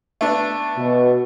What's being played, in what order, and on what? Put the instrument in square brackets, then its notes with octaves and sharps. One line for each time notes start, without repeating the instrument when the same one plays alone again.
[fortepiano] A3 B3 D4
[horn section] B2